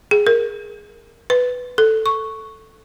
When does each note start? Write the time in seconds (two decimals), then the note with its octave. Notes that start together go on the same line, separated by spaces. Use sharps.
0.11 G#4
0.27 A#4
1.30 B4
1.78 A4
2.06 C#6